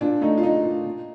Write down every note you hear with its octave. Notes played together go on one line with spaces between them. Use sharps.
A#2 D4
A3 D#4
F4
A3 D#4
A#2
A#2